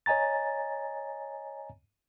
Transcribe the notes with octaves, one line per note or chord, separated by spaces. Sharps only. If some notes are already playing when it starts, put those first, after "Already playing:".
C#5 D#5 G#5 A#5 A6